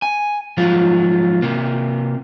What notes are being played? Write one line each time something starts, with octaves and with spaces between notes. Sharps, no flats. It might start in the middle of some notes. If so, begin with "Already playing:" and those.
G#5
G#2 F3 F#3 F4
C3 A#3